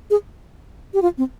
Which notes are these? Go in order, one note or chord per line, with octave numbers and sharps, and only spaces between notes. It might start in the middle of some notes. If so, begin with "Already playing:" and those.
G#4
G4
F4
C4